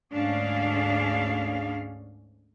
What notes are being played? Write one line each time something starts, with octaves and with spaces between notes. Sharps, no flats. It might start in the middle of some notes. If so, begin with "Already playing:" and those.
D2 G#2 C#4 D4 G#4 F5